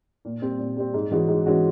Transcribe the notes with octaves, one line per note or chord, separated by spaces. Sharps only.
A#2
G3 C4
A#2
G3 C4
G#2
E3 G#3 C#4 F#4
G#2
E3 G#3 C#4 F#4